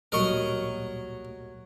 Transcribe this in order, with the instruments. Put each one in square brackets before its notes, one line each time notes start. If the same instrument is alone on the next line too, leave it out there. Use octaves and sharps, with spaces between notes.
[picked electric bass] D1 B1 A#2 [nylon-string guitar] F#3 G3 [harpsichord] A#4 D#5 C#6